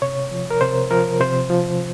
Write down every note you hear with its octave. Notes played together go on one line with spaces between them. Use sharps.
C3 C#5
F3
A#4
C3 C5
F3 A#4
C3 C5
F3